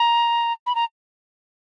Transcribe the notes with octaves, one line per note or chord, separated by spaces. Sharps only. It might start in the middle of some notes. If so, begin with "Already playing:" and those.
Already playing: A#5
B5
A#5